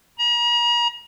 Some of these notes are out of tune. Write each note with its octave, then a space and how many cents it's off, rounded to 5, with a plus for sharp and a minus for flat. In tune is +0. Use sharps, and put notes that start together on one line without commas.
A#5 +40